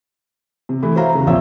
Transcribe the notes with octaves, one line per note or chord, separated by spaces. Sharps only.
C3
E3 A3 E4
F#4 C5 C#5 E5 F5 A#5
E2 C#3
A#1 F3 C4 C#5 E5 E6